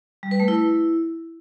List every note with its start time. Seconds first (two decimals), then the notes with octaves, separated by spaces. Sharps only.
0.23 G3
0.31 B4
0.40 A3
0.48 E4